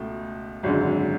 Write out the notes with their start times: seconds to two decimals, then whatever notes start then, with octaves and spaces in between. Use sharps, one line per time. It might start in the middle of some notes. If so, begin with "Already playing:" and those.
Already playing: C#2 B2 A3
0.63 G#1 F#2 D3 G#3